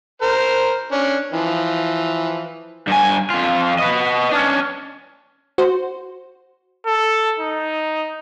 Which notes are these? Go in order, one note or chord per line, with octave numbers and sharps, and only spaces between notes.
A#4 C5
C#4 D4
E3 F3
G2 G#5
F2 F4
B4 D#5
C#4 D4
F#4 C5
A4
D#4